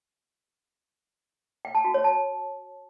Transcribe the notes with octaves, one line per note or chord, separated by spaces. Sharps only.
G5
A5
F#4
C#5
A5